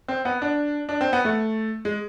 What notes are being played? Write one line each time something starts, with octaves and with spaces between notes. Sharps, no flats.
C4
B3
D4
D4
C4
B3
A3
G#3